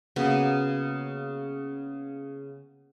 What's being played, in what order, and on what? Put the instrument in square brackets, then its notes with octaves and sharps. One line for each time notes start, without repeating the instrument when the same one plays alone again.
[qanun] C#3 A#3 B3 F#4